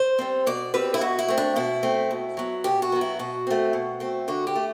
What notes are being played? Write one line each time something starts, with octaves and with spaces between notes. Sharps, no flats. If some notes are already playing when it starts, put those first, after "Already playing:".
Already playing: C5
G3 C4
B2 D5
G3 C4 B4
E4
B2 F#4
E4
A3 C4
D4
B2 E4
A3 C4
B2
F#3 B3
B2 G4
F#4
F#3 B3
E4
B2 F#4
A3 C4
B2
A3 C4
D3 F#4
G4
A3